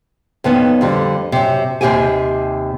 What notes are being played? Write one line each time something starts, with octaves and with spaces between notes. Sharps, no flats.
F2 D#3 B3 C#4
F2 D3 G3
F#2 C3
D#2 C3 E3 G4 G5 G#5